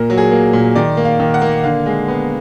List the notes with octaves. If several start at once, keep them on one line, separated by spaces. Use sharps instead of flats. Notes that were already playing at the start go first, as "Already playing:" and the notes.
Already playing: A#2 A#4
F#3
G#4
A#3
A#2
D#3 D5
A#3
F5
D#3
F#5
A#3
D3 F5
G#3
B3